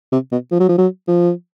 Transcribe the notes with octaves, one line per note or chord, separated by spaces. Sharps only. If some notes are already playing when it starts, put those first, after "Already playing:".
C3
B2
F3
F#3
F3
F#3
F3